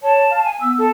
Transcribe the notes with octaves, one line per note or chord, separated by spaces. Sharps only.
C#5 A5
F5
G#5
B3 E6
A4